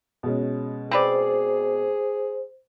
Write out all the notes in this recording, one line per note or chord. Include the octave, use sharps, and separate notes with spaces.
B2 G#3 C#4
C4 G#4 B4 C5 D5